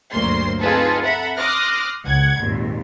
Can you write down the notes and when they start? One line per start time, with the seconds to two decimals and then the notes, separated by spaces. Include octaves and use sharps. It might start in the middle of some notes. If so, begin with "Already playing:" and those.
0.12 G1 D2 F#3 A#3 C5 C6
0.60 C4 D#4 F4 G#4 A4 B4
1.03 A4 E5 F#5 A#5 B5
1.36 C6 D6 D#6 F6 F#6 A#6
2.05 C#2 F#5 G#6
2.38 G#1 D#2 A#2